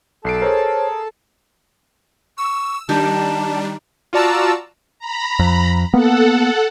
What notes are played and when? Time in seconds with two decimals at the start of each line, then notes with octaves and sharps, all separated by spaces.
0.25 B1 A4 A5 C7 D7
0.42 G#4 A#4 C5 C#5
2.38 C#6 E6
2.89 D#3 G3 D4 D#4 G4 A5
4.13 F4 F#4 D5 A5 A#5 E6
4.99 A#5 B5
5.39 F2
5.94 A#3 B3 A4 F#5